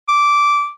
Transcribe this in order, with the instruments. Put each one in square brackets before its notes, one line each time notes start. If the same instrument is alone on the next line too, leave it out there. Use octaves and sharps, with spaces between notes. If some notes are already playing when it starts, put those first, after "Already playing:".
[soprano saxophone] D6